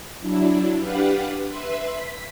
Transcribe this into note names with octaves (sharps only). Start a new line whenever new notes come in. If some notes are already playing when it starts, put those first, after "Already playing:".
F#3 D4 E4
D4 G4 B4 F5 F#5
B4 E5 C6
B6